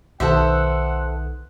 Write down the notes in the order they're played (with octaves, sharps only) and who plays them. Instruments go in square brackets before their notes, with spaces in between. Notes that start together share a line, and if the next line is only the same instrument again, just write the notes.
[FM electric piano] B1 D#3 [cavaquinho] A4 C5 E5 [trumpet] F#5